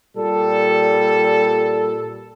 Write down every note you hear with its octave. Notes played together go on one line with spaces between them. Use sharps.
A#2 G3 A4